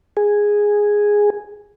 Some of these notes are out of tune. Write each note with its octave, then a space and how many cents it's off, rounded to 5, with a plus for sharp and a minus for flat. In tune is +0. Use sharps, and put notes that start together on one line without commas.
G#4 -5